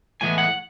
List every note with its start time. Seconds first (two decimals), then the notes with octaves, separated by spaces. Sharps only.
0.21 A2 E3 G#3 B3 G#5
0.38 F#5